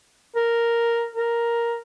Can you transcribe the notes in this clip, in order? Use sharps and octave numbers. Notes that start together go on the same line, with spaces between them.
A#4
A#4